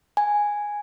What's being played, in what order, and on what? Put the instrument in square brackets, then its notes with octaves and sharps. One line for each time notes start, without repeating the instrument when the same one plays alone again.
[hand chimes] G#5